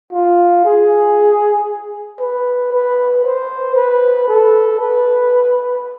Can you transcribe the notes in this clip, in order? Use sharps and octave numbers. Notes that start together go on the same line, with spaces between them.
F4
G#4
B4
B4
C5
B4
A4
B4